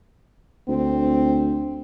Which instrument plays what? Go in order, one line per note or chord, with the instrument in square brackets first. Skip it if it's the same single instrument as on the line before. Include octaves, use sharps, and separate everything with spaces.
[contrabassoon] D2 [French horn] C4